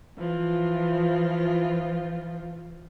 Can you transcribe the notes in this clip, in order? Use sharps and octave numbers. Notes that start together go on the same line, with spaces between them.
E3 F3 F4